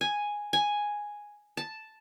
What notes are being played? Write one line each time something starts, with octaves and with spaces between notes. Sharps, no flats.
G#5
G#5
A5